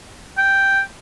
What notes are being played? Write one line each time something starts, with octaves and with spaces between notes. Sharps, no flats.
G5